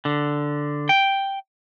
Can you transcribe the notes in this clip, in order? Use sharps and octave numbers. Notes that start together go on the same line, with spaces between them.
D3
G5